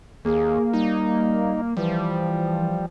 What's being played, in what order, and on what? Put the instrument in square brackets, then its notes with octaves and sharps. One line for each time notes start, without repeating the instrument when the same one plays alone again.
[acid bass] D#2 [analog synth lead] A#3 [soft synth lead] G#4
[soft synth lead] G3 [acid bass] D#4
[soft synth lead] E3 [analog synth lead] F3 [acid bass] G3